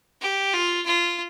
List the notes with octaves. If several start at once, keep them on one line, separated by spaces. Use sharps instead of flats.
G4
F4
F4